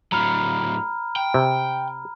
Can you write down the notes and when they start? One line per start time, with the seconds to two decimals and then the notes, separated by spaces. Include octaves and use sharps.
0.12 A2 F#3 A#5 B5 F6
1.16 G5
1.34 C3